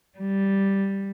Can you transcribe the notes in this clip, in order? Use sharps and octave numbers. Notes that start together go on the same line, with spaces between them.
G3